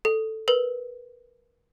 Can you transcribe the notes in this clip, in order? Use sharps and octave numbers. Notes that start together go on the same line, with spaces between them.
A4
A#4 B4